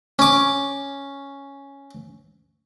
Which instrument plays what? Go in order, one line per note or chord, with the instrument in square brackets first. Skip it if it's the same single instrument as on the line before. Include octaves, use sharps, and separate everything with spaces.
[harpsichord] C#4 D6